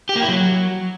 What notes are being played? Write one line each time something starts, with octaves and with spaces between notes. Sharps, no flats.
G4
A#3
E4
F#3